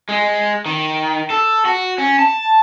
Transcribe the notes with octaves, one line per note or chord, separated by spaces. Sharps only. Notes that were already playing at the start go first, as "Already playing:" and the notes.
G#3
D#3
A4
F#4
C#4
A5